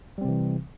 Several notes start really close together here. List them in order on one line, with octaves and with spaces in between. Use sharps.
G3 C4 C3 E3